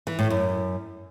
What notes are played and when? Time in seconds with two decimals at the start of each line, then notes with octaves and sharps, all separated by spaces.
0.07 E3
0.19 A2
0.30 F#2